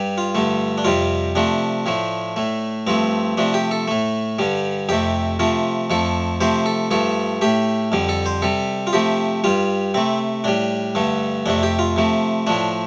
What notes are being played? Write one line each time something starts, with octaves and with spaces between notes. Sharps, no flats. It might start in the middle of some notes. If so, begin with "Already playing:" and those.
Already playing: G2 G3
F4
G2 D3 A3
D4
F2 C3 G3 F4
C3 F3 A3 D4
A2 F3 A3
A2 A3
G2 F3 A3 C4
C3 F3 A3 D4
G4
A4
A2 A3
G2 D3 G3
F2 C3 A3 G4
C3 F3 A3 F4
F2 F3 A3 A4
C3 F3 A3 C5
A4
G2 F3 A3 A4
A2 A3 G4
F2 D3 G3
A4
C5
C3 G3 A4
F4
C3 F3 A3 G4
G2 G3 F4
C3 A3 C4
A2 G3 D4
G2 D3 A3
F2 C3 A3 D4
G4
F4
C3 F3 A3
A2 F3 A3 D4